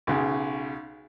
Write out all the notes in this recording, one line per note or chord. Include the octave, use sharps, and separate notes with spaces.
B1 C#3